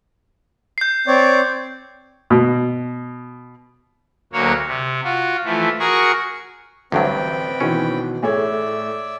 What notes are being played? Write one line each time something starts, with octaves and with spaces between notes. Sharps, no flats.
G6 C7
C4 C#5 D5
B2
D2 F#3 A#3 F#4 C#5
C3
F4 F#4
E3 F3 A3
F#4 G#4 A#4 C#6
A1 D2 G2 F#3 C4 B4 G5
B2 D#3 E3 C#4
A2 G#4 C#5 D5 E5 G#6